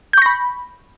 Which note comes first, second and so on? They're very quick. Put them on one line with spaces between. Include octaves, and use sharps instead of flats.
G6 C#6 A#6 B5